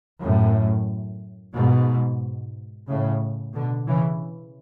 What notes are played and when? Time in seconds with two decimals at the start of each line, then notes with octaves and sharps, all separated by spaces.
0.23 F#2 A2
1.55 G#2 B2
2.88 A2 C#3
3.54 B2 D3
3.87 C#3 E3